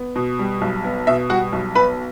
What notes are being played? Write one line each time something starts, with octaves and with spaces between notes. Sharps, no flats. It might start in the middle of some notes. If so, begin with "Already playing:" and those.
Already playing: B3
B2
G3
B1
B3
B2 E5
G3 F#4 F#5
B1
B3 B4 B5